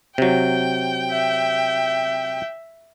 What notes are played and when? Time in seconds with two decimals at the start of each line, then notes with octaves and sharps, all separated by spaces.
0.18 C3 F#3 G5
1.11 E5